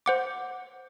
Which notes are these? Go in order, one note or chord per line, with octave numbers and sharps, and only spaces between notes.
C5 F#5 D6